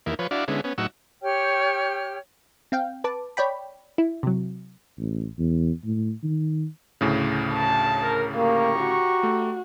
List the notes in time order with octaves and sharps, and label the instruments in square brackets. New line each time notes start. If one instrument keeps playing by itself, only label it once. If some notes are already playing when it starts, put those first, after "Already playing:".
[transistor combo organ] E2 D#3 A#3 E4
F3 B4 C#5
D4 E4 F#4 D5 F5
D3 G#3 B3 C#4 E4
B3 C#4
A2 F#3 D#4 F#5 C#6 E6
[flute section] G4 C#5 G5 F6
[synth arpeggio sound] C4 F5 G5
B4 A5 D6
C#5 D5 G5 B5
E4
C3 F#3
[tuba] A1
E2
A2
D#3
[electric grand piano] D2 A2 C#3
[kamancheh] A5
[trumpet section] A#4
[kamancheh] A#3 [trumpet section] G4 A#5 C#6
[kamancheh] F#4
[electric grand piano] A3